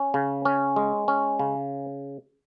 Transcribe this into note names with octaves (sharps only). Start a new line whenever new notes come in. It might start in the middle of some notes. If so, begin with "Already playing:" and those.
Already playing: C#4
C#3
C#4
G#3
C#4
C#3